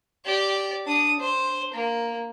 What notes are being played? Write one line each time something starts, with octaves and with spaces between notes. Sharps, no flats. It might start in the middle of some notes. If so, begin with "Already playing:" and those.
G4 D5
D4 D#6
C5
A#3